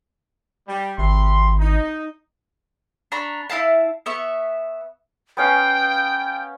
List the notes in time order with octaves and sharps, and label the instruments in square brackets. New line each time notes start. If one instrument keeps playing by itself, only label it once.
[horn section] G3
[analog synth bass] G#1 [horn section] C3 B5 C6
[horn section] D#4
[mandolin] D4 A#5 B5 C#6
E4 D#5 F5 A5
B3 E5 C#6
[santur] B3 C#4 F5 [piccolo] G5